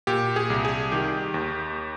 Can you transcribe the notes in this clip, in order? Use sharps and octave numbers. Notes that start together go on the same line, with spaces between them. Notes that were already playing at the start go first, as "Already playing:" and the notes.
A#2 G4
G#4
C2
G#4
D#3 G4
D#2